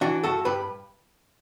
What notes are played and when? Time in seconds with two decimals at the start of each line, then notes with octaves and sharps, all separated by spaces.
0.01 E3 D4 F#4
0.23 G2 F#4 A4
0.45 G2 G4 B4